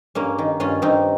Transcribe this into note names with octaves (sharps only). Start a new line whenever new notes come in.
G2 A#3 C#4
D#3
G2 C#4 F4
G2 C4 D#4